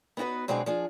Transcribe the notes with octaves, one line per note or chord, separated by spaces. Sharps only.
B3 D#4 E4 F#4 B4
B2 F#3 G#3 C4 D4 G#4
F3 D4 G#4